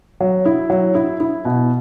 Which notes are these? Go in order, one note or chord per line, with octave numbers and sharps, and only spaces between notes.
F#3
E4
F#3
E4
E4
B2